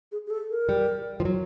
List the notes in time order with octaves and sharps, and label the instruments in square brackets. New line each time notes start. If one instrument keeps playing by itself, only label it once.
[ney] G#4
G#4
A4
A#4
[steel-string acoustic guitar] G3
F3
F#3